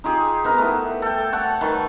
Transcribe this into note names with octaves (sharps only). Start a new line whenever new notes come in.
D#4 F4 G4 G#4
B3 D#4 A#4
A3 E4
A4 G5
C#5 F#5 A5
D#3 B4 C#5 A5